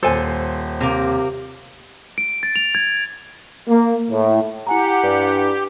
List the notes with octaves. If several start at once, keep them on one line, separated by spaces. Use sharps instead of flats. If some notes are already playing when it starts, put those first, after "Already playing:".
D#1 A4 C5 G#5
C3 A#3
D7
A6
F7
G#6
A#3
A2
E4 G4 F#5 G#5 A#5
G2